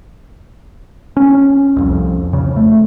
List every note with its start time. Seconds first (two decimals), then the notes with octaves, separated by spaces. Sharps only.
1.17 C#4
1.76 C2 F2
2.33 F2 C#3
2.56 A3